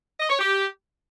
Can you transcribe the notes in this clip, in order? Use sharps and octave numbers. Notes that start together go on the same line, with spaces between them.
D#5
C#5
G4